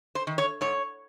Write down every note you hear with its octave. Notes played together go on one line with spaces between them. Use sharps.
C5
D#3
C#5
G#2 C#5